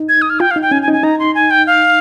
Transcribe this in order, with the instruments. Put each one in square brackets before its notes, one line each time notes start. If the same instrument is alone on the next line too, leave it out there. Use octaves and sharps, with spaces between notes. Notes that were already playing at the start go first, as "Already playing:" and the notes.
Already playing: [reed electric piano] D#4
[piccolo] G#6
D#6
F6
[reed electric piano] F4 [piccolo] G5
[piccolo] F5
[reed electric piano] D#4
[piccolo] G5
[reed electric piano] C#4 [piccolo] G#5
[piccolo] G#5
[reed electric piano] D#4
[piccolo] G#5
[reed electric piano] D#4 [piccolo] A#5
[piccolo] C6
G#5
G5
F5